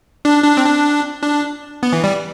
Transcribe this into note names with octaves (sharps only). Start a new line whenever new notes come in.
D4
D4
C4
D4
D4
B3
E3
G3